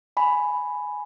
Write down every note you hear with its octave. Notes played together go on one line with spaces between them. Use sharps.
G#5 B5